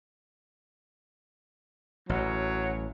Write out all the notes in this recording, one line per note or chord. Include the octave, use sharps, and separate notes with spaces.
A1 F#3